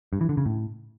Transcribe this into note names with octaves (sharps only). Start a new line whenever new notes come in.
G2
E3
D3
C#3
A2